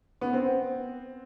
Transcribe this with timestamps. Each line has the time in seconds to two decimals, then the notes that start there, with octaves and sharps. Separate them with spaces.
0.21 B3
0.33 C4